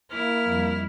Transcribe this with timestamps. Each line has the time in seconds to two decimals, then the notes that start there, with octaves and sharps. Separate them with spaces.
0.13 A#3 E4 F6
0.46 F2 G3